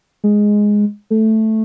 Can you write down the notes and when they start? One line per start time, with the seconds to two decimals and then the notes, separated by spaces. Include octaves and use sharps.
0.24 G#3
1.10 A3